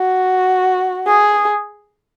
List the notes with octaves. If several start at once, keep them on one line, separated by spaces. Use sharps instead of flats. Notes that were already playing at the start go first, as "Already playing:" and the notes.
Already playing: F#4
G#4